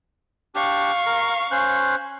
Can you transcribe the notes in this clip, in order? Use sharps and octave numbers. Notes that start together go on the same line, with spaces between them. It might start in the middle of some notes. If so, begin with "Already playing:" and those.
D4 G4 F5 C#6
A#4
C#4 C5 F#6